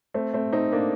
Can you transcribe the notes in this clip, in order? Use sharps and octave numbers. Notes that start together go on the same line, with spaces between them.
A3 C4
A3 C4
C4 D#4
A#3 D4